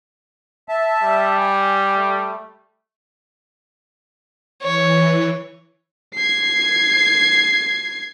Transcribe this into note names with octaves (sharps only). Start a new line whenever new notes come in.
E5 A5
G3
G#5
A3
E3 C#5
G#6 C7